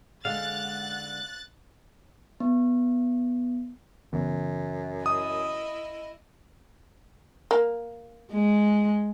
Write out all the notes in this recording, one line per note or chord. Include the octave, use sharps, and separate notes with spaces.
D3 G#3 F5 F#5 F#6 A6
B3
F#2 C#3 E3 B3
E4 D#5 D#6
A#3
G#3